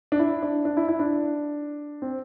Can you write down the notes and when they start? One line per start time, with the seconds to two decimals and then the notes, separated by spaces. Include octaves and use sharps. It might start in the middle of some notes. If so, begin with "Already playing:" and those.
0.12 D4
0.19 E4
0.43 D4
0.65 D4
0.77 E4
0.88 E4
0.99 D4
2.02 C4